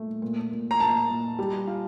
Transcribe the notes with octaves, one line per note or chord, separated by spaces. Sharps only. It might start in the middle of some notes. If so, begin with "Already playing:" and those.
Already playing: A#2 A3
A#2
A#2
A#5
A#2 A5
A#2
G3
F4